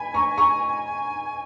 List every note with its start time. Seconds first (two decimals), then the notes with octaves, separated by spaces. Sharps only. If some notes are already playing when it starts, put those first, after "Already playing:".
Already playing: G#5 B5
0.14 A#5 C#6
0.38 A#5 C#6